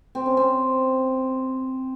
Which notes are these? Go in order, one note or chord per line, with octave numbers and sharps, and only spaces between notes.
C4
C#4
C4